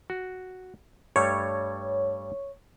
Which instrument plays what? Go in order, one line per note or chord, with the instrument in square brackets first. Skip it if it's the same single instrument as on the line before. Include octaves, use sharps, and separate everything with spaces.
[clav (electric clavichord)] F#4
[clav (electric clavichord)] G2 G3 A3 [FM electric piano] C#5